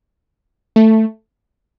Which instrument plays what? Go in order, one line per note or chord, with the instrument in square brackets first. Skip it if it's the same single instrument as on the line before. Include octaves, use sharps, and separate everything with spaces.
[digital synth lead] A3